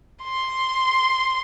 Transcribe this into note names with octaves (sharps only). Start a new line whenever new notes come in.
C6